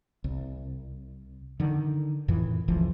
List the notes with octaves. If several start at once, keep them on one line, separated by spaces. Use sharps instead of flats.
C2
D3 D#3
F2 A2 D#3 E3
F#1 C#2 E3 F3